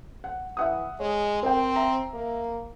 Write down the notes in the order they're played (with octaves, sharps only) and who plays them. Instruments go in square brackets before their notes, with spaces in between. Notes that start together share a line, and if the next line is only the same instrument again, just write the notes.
[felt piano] F#5
[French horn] E3 [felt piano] E5 F#5 D#6
[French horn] G#3 [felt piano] C#5
[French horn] C4 [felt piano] A#4 G5
[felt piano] E5 A#5
[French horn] A#3